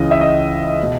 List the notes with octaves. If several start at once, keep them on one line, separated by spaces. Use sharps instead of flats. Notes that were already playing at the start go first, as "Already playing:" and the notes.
Already playing: C#2 C#3 E3 D#5
E5
D#5
B2